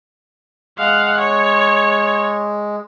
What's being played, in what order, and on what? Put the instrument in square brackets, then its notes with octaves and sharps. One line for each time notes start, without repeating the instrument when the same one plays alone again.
[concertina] G#3 [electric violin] F5 F#5
[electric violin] C#5